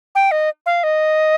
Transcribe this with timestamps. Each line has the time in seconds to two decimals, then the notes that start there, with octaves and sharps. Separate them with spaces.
0.15 G5
0.31 D#5
0.66 F5
0.84 D#5